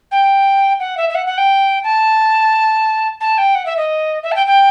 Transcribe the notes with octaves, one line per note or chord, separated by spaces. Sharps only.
G5
F#5
E5
E5
F#5
F#5
G5
A5
A5
G5
F#5
E5
D#5
E5
A5
G5
G5